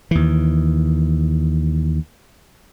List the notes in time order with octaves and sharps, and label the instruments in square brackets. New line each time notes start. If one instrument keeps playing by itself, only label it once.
[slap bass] D#2 E3